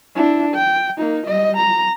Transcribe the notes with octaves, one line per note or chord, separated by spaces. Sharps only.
D4 E4
G5
A#3 D#4
G3 D#5
A#5